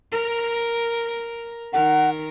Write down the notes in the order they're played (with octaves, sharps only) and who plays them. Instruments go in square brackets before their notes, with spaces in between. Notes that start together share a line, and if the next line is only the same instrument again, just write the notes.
[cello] A#4
[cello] D#3 A#4 [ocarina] F#5